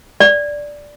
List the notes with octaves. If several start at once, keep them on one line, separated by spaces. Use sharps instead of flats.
D5